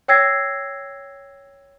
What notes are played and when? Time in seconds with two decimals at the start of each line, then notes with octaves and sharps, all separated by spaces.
0.08 C#5 G5 E6 G#6 A#6 C7